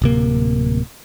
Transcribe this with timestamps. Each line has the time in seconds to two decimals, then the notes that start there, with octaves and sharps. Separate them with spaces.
0.02 D1 C3 A#3